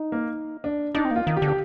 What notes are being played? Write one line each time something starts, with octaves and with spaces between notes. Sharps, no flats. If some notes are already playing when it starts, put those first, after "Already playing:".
Already playing: D#4
A#3
D4
D4 D#4
C4
A#3 F4
D#3 F4
G4
D3
G4